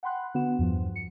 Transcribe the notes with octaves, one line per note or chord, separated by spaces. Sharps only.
F#5 G5 B5 C6 F#6
D3 B3 F#4 F#5 E7
E2 G2 F3
C#7